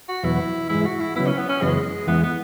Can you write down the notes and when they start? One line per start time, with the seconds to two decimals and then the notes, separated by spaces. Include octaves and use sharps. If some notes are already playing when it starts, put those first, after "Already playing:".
0.09 F#4
0.23 E2 B2 F#3 E4
0.69 G#2 E3 G#3 E4
0.85 F#4
1.00 E4
1.16 C#3 F#3 B3 E4
1.26 C#4
1.38 B3
1.49 C#4
1.62 F#2 C#3 E3 G#3 B3
2.07 E2 E3 G#3 B3
2.23 B3